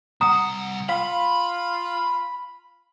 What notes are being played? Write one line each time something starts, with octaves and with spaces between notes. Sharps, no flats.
C2 F#5 A#5 D#6
F4 F5 B5